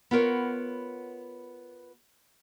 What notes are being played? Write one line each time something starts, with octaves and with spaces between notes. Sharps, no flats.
B3 F4 A#4 C#5